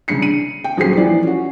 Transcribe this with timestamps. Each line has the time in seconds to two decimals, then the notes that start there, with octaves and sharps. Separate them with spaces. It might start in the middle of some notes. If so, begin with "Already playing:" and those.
0.08 C2 C#3 D4 C7 C#7
0.22 D#7
0.64 G5
0.77 D#1 F#3 C#4 G#4 C5 C7
0.97 E3 F3 E4 D5
1.23 C#4 F#4